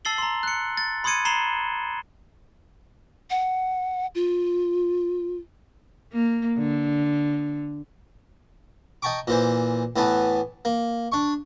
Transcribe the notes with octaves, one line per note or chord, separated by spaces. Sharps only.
A5 E6 A6 C7 F#7 G7
A#5 C6
F#6 C#7
A6
B5 C6 D#6 G#6 C#7 D#7
A#5 B5 C7 E7 F#7 G7
F#5
F4
A#3
D3
D#5 G5 A5 A#5 C#6 D6
A#2 E3 C5
A2 E3 B3 A5
A#3
D4 C#6